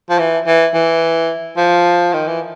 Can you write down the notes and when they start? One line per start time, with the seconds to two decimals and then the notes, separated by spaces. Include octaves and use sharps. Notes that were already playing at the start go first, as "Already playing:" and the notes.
0.10 F3
0.19 E3
0.47 E3
0.74 E3
1.57 F3
2.14 D#3
2.27 E3